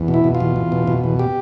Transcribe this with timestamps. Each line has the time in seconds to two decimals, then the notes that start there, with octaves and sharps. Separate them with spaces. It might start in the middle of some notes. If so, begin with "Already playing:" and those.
Already playing: E2
0.08 B2
0.14 E4
0.24 B2
0.35 F4
0.40 E2
0.56 E2
0.72 B2
0.87 B2
1.04 E2
1.19 G4